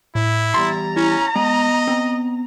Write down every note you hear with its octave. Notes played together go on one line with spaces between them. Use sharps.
A2 E4
E2 G3 A#5 C6 A6
C#4 E4
G#3 B3 D#5
C4